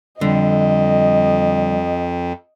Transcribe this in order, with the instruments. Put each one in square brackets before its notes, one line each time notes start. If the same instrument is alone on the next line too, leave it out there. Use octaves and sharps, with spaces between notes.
[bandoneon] F2 [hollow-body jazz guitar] D3 [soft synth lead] G3 [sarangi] D#5